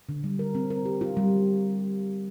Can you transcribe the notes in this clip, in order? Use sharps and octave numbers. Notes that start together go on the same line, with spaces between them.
D3
G3
A#4
C4
A#4
G4
F4
G3